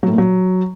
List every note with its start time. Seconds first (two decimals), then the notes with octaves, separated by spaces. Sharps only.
0.03 F#3
0.08 A2
0.13 A#2
0.18 F#3